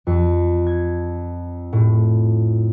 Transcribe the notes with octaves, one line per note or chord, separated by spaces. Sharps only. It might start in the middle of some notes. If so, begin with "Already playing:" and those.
F2
G#6
A2